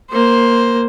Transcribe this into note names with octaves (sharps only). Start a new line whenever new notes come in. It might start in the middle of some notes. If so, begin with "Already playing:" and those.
A#3 C5